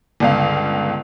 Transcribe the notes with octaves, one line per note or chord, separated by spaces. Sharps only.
G1 C#2 F5